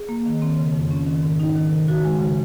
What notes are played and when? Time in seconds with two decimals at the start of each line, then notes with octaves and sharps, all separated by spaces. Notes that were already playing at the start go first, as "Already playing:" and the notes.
Already playing: G#4
0.09 A#3
0.26 D#3
0.42 C4
0.58 C#3
0.75 F2
0.91 C#4
1.06 D#3
1.23 G#2
1.40 D#4
1.56 D#3
1.71 C3
1.88 F#4
2.05 G#3
2.20 C#3